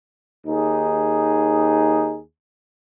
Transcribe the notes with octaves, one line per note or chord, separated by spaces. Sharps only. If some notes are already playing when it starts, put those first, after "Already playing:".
D#2 D#4 G#4